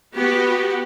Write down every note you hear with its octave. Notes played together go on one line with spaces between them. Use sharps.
B3 F#4 G4